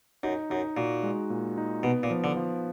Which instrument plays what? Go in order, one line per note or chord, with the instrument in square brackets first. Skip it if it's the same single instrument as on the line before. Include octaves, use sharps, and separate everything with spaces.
[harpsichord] F#2 [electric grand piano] D#4
[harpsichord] F#2 [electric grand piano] D#4
[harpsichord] A#2 [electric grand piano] F#4
[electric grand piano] G#3
A#2
D#4
[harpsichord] B2 [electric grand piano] B3
[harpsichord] A#2
[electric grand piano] F3
[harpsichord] D3
[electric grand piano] F3